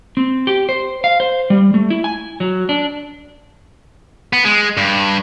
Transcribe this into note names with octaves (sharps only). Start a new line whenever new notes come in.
C4
G4
C5
F5
C5
G3
A3
E4
G#5
F#3
D4
B3
G#3
G2